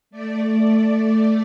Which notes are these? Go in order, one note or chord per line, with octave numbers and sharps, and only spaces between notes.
A3 D5